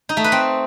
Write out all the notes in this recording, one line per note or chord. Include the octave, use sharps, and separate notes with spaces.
D#4
A3
B4
C4